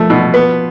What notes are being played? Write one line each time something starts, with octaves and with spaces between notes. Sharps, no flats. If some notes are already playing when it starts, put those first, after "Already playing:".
Already playing: F3 A3
B2
B3